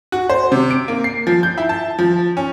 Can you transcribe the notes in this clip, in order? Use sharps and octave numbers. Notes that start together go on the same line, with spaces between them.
F#4
C5
C3
D7
A#3
C7
F3
G6
E4
A5
F3
C#4